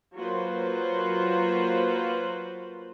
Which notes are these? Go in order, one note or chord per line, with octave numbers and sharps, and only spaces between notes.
F#3 A#3 F4 B4 C5